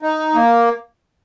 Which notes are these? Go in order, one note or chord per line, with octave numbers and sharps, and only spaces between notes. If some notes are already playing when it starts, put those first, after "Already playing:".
D#4
A#3